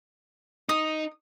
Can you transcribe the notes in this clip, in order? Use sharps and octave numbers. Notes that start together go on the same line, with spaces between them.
D#4 D#6